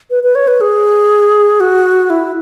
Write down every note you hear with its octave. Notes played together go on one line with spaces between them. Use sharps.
B4
B4
C#5
B4
G#4
F#4
E4